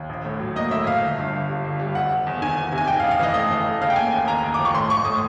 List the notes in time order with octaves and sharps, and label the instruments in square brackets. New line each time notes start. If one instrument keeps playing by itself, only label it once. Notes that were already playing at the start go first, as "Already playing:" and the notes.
Already playing: [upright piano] D#2
A#1
A2
F#3
A#3 D#5
A2 E5
A#1 F5
G1
G2
G1
G3
G1
G3
F1 F#5
F1
E2
D#3 G#5
E2
C3
G#5
G#2 G5
F5
A1
F5
E3 D#5
A3 D#5
E3
A3
C#3 F5
G5
A#3 G#5
D#2
D#2 A#5
D#2
D6
F3
C#6
A2 C6
A2 C#6
A2 D#6